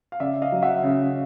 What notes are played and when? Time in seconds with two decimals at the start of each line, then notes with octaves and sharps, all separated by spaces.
0.12 F5
0.20 C#3 D5 E5
0.42 D#5 F5
0.52 F#3
0.62 E5 F#5
0.83 C#3